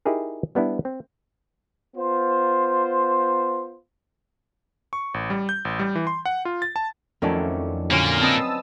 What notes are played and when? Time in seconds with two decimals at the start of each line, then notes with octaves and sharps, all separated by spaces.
0.05 D#4 E4 G4 G#4 A#4
0.55 G3 B3 D4 E4
0.85 C4
1.96 B3 F4 C5
4.93 C#6
5.14 A1
5.30 G3
5.49 G6
5.65 A1
5.79 G3
5.95 E3
6.07 C6
6.25 F#5
6.45 F4
6.62 A6
6.76 A5
7.22 F2 D#3 F#3 A3 C#4 E4 D5
7.91 A#2 D3 F#3 A#3 C#4 G5
8.22 C4 B4 D#5 A5 D#6 E6